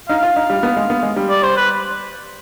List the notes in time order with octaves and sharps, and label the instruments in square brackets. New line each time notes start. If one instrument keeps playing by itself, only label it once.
[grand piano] D#4 [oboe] F5
[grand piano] F4
D#4
G3
B3
G#3
B3
G#3
G3
[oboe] D5
C5
B4